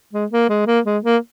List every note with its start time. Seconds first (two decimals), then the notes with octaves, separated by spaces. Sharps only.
0.13 G#3
0.31 A#3
0.49 G#3
0.67 A#3
0.85 G#3
1.05 A#3